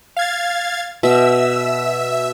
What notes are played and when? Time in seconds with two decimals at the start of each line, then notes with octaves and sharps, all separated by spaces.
0.17 F5 G#6 A6
1.03 B2 E5 E6